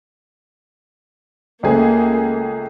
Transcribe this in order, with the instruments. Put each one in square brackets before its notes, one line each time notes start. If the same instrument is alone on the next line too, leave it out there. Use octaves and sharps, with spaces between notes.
[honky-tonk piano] C#2 A3 G#4 [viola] A#3